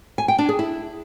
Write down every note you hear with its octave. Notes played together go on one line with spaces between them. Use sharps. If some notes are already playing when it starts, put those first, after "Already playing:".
G#5
G5
D4
G#4
E4